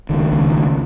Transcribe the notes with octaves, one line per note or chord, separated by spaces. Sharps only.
C#2 D#3
C#2
C#2